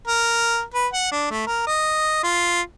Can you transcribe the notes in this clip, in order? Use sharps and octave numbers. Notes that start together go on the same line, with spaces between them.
A#4
B4
F#5
D4
A3
A#4
D#5
F4